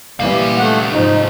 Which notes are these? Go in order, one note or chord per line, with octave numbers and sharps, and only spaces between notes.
A#2 E3 G3 G#3 F5
A3 F#5
G#2 F3 D#4